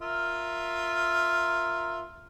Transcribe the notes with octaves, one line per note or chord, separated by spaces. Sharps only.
F4 A#4 E5